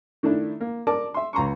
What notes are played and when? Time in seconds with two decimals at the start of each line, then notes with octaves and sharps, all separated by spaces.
0.23 D#3 A3 D4 E4
0.61 A#3
0.87 A#4 D5 A5 D6
1.14 E5 C6
1.33 C#2 A#5 C6 C#6